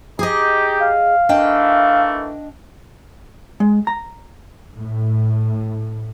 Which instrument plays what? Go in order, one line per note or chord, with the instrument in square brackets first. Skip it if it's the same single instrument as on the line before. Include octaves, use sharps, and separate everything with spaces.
[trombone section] D#4 G4 [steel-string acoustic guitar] G#4 D#5
[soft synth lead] F5
[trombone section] D#3 E3 A3 [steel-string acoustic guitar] D4 D#5 G5
[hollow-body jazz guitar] G#3
A#5
[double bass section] A2